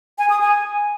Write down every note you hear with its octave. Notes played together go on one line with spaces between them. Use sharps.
G#5
D#6
G#5